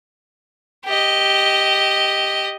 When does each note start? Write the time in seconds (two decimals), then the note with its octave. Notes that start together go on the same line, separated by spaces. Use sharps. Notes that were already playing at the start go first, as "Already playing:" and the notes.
0.85 G4 D#5